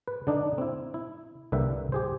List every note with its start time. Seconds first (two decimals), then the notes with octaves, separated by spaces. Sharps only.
0.08 B4
0.27 D3 D4 D#4
0.58 C4 E4
0.94 E4
1.52 C2 D3 A#3 B4 E5 G5
1.92 G4 G#4 C5